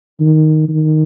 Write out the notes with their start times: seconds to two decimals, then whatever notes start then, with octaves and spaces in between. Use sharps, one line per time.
0.21 D#3
0.69 D#3